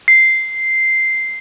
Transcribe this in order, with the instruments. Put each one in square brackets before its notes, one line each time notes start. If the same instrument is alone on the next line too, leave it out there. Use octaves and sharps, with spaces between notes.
[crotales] C7